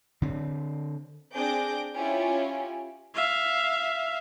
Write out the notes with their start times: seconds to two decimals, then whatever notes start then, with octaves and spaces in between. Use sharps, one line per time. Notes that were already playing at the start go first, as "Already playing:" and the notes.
0.22 D3 C4
1.33 C4 D4 G#4 D6 G6 A#6
1.95 C#4 E4 F4 G4 G#5
3.15 E5 F5